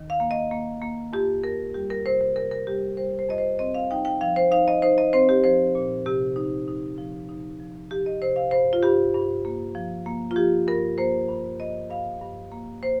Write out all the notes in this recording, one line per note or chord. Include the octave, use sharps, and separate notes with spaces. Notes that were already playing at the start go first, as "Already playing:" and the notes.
Already playing: D#2 D#3
F5
A#3
D#5
A#3
A#3
F2 G4
F2 A#4
G3 G4
A#4
C3 C5
C5
C3 A#4
A#4
G3 G4
G3 C5
C5
F2 D#5
C5
C4 D#5
F5
D#4 G5
G5
F3 F5
C5
D#4 F5
D#5
D#4 C5
D#5
C4 C5
G4
F3 C5
A#2
C3 G4
D#4
D#4
F3
D#4
F3
F3 G4
D#5
C3 C5
F5
G2 C5
F4
G2 G4
G2
A#3
F3
A#3
F4
F3 G4
G2 A#4
A#3 C5
G2
G2 D#5
G2 F5
G2
A#3
A#3 C5